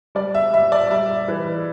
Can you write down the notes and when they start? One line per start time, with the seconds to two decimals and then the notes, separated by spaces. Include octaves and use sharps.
0.15 G3 D5
0.35 E5
0.53 G3 E5
0.72 D5
0.91 G3 E5
1.28 E3